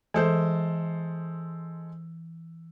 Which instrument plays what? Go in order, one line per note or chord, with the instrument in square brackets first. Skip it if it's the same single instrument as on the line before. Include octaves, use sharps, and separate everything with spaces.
[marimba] E3 [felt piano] G#3 A4 C5